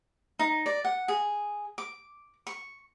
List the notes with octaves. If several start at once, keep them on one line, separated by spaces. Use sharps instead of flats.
D#4
D5
F#5
G#4
D6
C#6